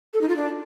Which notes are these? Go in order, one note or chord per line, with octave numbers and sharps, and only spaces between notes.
A4
D#4
F4
D4